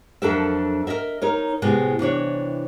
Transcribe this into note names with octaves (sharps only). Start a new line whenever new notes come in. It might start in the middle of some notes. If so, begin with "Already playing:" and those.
F2 F#3 D4 A4 A#4 E5
A#4 C5 D#5 E5
D#4 A#4 C#5
A2 C3 G#3 B3
C3 E3 D4 C#5